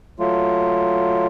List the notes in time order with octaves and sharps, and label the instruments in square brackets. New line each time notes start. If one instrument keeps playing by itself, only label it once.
[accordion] F#3 A3 F4